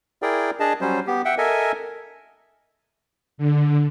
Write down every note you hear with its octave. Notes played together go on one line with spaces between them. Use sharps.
E4 G#4 A#4 D5 G5
D4 G#4 D#5 A5
F#3 G3 C#4 C5
B3 G4
E5 F#5 G5
A4 A#4 D#5 E5 G#5
D3